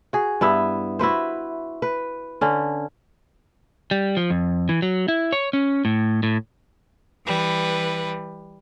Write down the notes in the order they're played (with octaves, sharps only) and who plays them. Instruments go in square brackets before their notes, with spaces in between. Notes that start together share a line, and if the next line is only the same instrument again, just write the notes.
[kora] F#4 G#4
G2 B3 E4 E5
E4 F#4 B4 C5
B4
D3 C#4
[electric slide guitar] G3
F3
F2
E3
F#3
E4
C#5
C#4
A2
A2
[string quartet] E3 G3 B4